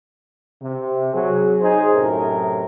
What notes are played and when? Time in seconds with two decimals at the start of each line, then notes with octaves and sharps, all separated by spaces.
0.62 C3
1.14 F#3 G#4
1.61 D#4 G#4 C5
1.94 F#2 A2 C3 A#4